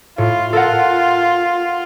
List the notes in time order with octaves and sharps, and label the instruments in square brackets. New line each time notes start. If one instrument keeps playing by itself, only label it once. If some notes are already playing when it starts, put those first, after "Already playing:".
[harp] A2 [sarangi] F4
[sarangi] F4 [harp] A4 A#4 F#5